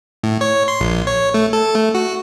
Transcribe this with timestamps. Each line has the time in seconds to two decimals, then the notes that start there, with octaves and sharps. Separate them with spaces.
0.24 A2
0.41 C#5
0.68 C6
0.81 A#1
1.07 C#5
1.34 A3
1.53 A4
1.75 A3
1.94 F#4